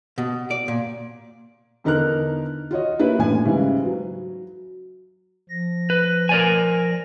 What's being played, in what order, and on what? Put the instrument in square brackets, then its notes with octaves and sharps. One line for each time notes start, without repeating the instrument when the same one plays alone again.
[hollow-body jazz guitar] B2
D5
A#2
[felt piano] E2 D3 D#4 A#4 F6 F#6
F4 F#4 C#5 D#5
A#3 D4 E4 G4 B4
A1 A2 A#3 G#5
G#2 C#3 E3 G3
F#3
[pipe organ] F3 A#6
[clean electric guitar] B4
A#4 D5 G#5